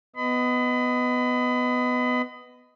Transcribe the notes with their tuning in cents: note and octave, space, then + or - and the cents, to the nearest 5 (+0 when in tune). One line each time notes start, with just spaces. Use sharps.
B3 +10 D#5 +0 B5 +35